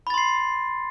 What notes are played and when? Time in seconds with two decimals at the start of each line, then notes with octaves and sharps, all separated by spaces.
0.07 B5
0.10 A6
0.14 C6
0.18 C7